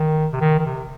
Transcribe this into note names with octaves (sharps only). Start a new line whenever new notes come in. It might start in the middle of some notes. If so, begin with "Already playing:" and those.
Already playing: D#3
C3
D#3
D#3
C3